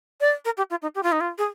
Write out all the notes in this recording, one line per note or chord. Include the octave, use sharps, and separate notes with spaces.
D5
A#4
G4
F4
D#4
G4
F4
D#4
F4
G#4